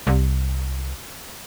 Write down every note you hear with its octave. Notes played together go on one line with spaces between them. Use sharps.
C2